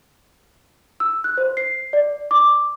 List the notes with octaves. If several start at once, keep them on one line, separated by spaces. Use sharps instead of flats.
E6
F#6
C5
C7
D5
D6